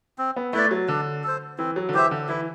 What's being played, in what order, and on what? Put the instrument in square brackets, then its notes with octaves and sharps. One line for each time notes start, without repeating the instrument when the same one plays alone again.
[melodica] C4
[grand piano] B3
[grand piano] A3 [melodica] E4 B4 D5
[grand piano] F#3
[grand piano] D3 [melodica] D4
[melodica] A4 C5
[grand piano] E3 [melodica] C4
[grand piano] F#3
D3
[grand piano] E3 [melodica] G4 C5 E5
[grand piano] D3
[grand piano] E3 [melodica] E4